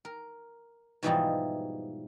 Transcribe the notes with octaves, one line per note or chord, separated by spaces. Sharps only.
A#4
G#2 B2 E3 F3 G3 D#4